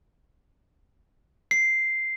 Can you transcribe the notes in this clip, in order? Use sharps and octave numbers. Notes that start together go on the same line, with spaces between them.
C7